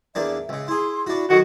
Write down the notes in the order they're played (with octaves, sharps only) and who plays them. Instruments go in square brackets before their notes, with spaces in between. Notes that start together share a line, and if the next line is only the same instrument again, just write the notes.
[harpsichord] E2 A#3 D4 [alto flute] E5
[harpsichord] C#2 C#3
[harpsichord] E4 G#4 [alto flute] C6
[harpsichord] D4 F#4 [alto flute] E4
[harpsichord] D#3 F#3 [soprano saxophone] F#4 [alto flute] A4